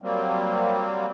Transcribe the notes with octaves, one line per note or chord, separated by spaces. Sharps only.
F#3 G3 A#3 C4